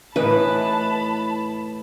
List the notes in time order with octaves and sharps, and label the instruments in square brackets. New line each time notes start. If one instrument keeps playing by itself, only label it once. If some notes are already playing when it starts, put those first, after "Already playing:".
[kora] A2 E3 D#4 [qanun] B4 [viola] A5 B5